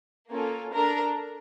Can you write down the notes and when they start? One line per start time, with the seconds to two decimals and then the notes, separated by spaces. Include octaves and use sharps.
0.29 A#3 C#4 F4 A4
0.73 D4 A4 A#4 A#5